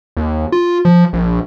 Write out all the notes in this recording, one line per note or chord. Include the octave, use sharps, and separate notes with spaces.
D#2
F4
F3
A#1